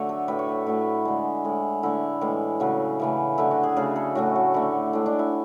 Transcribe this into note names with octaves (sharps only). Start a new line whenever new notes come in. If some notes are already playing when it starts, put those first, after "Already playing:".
Already playing: D3 F#3 A3 C#5
A4
A2 F#3 A3 B4
C#5
B4
A2 F#3 A3 E4
D3 G#3
A2 G#3
D3 A3 E4
A2 E3 G#3
C#3 F#3 A3
C#3 E3 A3
D3 F#3 A3 E4
F#4
G#4
C#3 F#3 A3 G#4
A4
A2 F#3 A3 F#4
F#4
D3 A3 E4
A2 G#3 D4
D4
E4